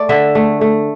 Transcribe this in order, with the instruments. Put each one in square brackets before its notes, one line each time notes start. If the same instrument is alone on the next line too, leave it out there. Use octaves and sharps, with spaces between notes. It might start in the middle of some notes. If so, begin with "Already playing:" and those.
Already playing: [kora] A3 D5
D3 E5
A3
A3